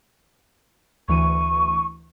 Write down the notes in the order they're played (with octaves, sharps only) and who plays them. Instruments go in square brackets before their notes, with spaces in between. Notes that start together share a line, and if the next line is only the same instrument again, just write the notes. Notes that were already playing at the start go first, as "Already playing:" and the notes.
[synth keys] D2 E3 D#7 [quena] C#6